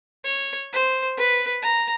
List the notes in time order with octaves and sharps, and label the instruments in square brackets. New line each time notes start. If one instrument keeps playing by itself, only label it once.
[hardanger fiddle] C#5
C5
B4
A#5